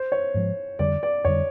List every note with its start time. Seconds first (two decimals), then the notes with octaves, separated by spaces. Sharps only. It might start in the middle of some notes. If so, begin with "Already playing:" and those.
Already playing: C5
0.12 C#5
0.34 G#2 F3 G#3
0.79 F2 D3 G3 D5
1.03 D5
1.25 F2 D3 G3 C#5